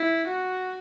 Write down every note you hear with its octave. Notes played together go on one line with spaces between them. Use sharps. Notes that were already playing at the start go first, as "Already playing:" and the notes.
Already playing: E4
F#4